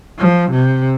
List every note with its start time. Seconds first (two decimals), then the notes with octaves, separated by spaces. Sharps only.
0.18 F3
0.51 C3